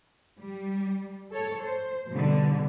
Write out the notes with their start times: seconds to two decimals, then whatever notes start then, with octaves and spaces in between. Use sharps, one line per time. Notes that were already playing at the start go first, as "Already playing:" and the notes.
0.38 G3
1.32 A4 C#5
1.63 C5
2.11 B2 D3 G3